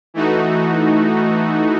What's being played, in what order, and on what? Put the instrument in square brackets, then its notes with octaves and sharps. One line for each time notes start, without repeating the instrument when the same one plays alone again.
[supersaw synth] E3 A3 D#4 F#4